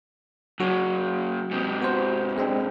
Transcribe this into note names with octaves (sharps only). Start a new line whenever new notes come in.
F#2 C#3 F#3 F#4
G#2 C3
B3 F#4 C5
G#3 C4 D4